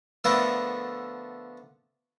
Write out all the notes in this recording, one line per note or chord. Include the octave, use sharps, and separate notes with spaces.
D3 F3 A3 B3 A4 A#4